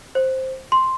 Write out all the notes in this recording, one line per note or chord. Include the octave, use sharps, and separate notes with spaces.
C5
C6